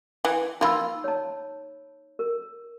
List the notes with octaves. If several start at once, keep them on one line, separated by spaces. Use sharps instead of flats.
E3
A#3 D#4 F4 B5 E6
C#5 A5
A#4